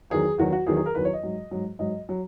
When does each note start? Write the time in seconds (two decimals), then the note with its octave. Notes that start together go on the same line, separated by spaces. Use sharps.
0.10 E2 D#3 F#3 G#4
0.38 E2 D#3 F#3 F#4
0.52 F#4
0.67 E2 D#3 F#3 G#4
0.77 G#4
0.86 A#4
0.95 E2 D#3 F#3 B4
1.05 C#5
1.13 D#5
1.23 G#2 F#3
1.51 G#2 F#3
1.79 G#2 F#3 D#5
2.09 F#3